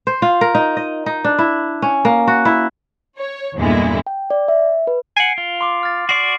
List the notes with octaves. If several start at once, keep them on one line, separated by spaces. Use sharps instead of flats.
C5
F4
A#4
D#4
D#5
D#4
D4
E4
C#4
A#3
F#4
E4
C#5
E2 G2 A#2 D3 G#3 E4
G5
D5
E5
B4
F#5 G#5 C7 D7
F4
C6 D6
F6 A6
F#4 D5 C#6 C7